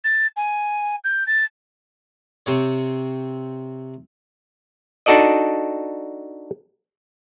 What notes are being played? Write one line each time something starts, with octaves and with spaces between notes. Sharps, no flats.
A6
G#5
G6
A6
C3 C4 C#5
D4 D#4 F#4 A4 D5 D#5